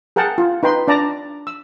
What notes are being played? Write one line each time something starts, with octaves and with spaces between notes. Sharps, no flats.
G#4 A#4 F#5 G5 A5
F4
D#4 B4 G5 C6
D4 D5 A5 A#5
E6